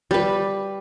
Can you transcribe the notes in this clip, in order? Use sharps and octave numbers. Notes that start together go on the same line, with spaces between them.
G3 B4